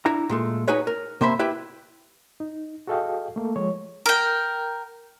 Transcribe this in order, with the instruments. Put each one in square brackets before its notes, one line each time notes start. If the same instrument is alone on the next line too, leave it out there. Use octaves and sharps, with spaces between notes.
[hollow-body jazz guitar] D4 E4 A#5
A#2 G#3 A3
D#4 F#4 G#4 B4 C#5
A#4
C3 A#3 C5 E5 B5
E4 G4 B4 E5
[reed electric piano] D#4
F#4 G#4 A4 D#5 F5 G5
A3 A#3 A4
F3 G#3 C#5
[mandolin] A#4 G5